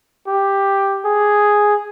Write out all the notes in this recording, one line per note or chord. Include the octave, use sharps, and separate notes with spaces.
G4
G#4